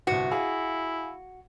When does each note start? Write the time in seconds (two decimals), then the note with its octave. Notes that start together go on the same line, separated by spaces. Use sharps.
0.07 G1 C2 F#4
0.31 E4 G#4 F5